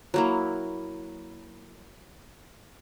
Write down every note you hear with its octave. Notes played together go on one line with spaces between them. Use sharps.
F#3 A#3 E4